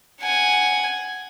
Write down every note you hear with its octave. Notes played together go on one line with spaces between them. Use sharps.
F#5 G#5